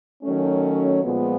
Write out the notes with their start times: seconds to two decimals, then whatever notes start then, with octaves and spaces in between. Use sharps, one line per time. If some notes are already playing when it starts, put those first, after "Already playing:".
0.23 D#3 F#3 A3 C#4
1.04 A#2 F3 G#3 B3